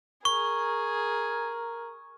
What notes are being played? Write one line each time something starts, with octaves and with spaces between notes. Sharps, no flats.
G#4 A#4 C#6